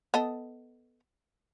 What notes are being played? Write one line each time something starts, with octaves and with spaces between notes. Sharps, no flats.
B3 A4 D#5